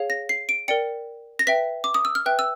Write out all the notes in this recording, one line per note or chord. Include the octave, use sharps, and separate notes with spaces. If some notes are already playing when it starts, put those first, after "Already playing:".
Already playing: G#4 C#5 F5
A#6
C7
D7
A#4 D5 G5 C#7
A#6
B4 E5 G5 B6
D6
D#6
E6
F6
B4 E5 G5 F#6
E6